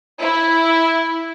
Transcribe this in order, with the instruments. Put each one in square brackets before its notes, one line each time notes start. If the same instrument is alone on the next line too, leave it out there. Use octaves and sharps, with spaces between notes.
[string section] E4